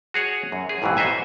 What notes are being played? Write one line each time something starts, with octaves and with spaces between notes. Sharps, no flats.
F#4 G#4 C#5 F#5
F#2
G#4
A1 F2 G#2 B2 E3
F#4 C5 E5 G#5